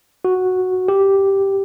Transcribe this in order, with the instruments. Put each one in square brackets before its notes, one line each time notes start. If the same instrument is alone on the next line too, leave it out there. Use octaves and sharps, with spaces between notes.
[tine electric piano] F#4
G4